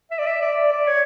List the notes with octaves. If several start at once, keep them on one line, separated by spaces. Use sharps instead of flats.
E5
D5
E5
D5
D5
C#5